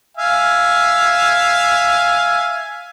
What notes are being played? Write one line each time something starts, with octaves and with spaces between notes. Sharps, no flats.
E5 F5 G#5